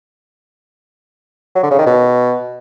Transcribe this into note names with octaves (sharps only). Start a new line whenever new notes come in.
F#3
D3
C#3
D#3
B2